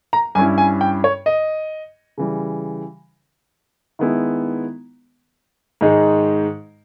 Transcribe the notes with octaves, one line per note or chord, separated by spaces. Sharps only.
A#5
G2 G3 C#4 E4 G#5
G#5
G5
C#5
D#5
C#3 E3 G3
D#3 G#3 B3 E4
G#2 D#3 G#3 D#4